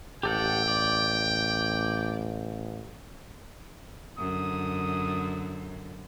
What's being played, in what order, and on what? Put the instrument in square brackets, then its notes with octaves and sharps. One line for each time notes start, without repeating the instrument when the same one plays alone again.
[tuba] A1 [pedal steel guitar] G4 A4 F#5 [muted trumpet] G5
[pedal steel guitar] D5
[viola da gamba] F#2 D3 [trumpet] D#6